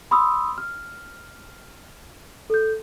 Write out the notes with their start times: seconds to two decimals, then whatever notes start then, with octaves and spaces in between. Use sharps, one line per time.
0.11 B5 C6 D#6 E6
0.58 F6
2.50 A4 G6